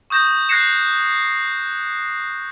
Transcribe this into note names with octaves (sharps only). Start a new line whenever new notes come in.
C#6 D#6 G6 A#6 E7
F#6 G#6 A#6 C7 C#7 E7